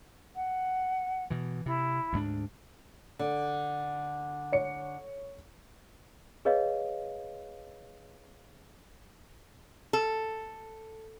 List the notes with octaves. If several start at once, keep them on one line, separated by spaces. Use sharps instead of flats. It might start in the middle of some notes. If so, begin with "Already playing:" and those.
F#5
B2 E3
C3 E4
D2 G#2 D4
D3
C#5 C#7
G#4 B4 C#5 D#5 F5
A4